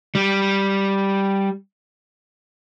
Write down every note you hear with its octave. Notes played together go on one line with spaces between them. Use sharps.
G3